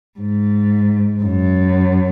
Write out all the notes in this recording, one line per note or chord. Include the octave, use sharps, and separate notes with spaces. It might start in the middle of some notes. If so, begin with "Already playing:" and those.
G#2
F#2